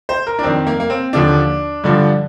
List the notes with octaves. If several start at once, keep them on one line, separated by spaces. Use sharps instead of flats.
C5
A#4
D4
F2 D#3 C4
A#3
A#3
C4
D#2 D3 F3 D4
G2 D3 F3